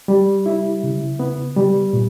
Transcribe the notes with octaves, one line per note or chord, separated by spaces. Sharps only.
G3
E4
C#3
B3
G3
A#2